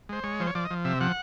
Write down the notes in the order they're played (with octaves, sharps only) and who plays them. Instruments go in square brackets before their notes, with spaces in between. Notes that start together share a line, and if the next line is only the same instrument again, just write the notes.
[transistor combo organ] G#3 C5
G#3 C#5
F3 C5
C#5
F3 D5
D#5
F3
C3 E5
F3 F#5